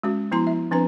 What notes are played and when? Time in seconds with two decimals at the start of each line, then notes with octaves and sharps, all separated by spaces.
0.03 G#3 C#4 F#4
0.31 F3 B3 E4 A#5 C6
0.47 E5
0.71 F3 C4 D4 B4 A#5